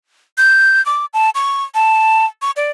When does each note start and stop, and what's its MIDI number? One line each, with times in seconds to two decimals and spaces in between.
0.38 0.84 91
0.86 1.06 86
1.13 1.30 81
1.35 1.64 85
1.75 2.25 81
2.42 2.51 85
2.56 2.71 74